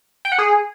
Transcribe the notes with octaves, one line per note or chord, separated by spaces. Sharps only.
G5
F#5
G#4